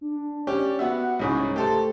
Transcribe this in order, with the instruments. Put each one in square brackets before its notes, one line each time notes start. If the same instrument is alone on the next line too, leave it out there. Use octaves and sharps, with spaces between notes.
[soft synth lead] D4
[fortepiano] C#4 G4 [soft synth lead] D5
[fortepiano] B3 F#4 E5 [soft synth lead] F#5
[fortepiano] C2 G#2 C#3 [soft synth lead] C#5
[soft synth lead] A3 [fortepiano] G4 A4 C5